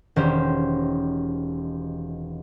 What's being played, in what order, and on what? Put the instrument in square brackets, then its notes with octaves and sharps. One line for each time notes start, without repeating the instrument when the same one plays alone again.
[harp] E1 D#3 C#4 G4 C5